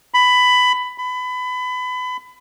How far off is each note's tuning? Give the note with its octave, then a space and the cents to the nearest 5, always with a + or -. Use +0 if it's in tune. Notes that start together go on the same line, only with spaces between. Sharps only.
B5 +15
B5 +25